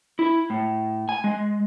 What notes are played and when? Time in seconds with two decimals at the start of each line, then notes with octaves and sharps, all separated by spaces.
0.19 E4
0.50 A2
1.09 G#5
1.24 G#3